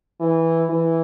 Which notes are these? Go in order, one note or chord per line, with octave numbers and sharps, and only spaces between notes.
E3
E3